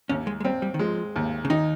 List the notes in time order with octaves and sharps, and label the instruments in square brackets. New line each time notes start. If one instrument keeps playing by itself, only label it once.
[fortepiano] D#2 [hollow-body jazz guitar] C#4
[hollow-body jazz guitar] G#3
G#3
[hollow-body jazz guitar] G3 [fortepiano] C4
[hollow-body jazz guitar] G3
D#3
[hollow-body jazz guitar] F3 [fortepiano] G#3
[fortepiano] D#2
[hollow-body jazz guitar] C#3
[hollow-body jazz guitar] D#3 [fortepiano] D#4